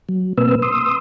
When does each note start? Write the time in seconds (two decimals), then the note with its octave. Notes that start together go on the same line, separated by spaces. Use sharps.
0.09 F#3
0.38 B2 A#3 C4 B4 E6
0.62 C6 D#6 E6